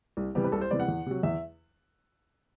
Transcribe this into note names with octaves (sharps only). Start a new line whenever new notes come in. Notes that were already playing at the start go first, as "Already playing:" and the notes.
C2
C3 E3 G3 B3 G4
B4
C2 A4
C5
C3 E3 G3 B3 D5
F#5
E2
C3 F#3
E2 E5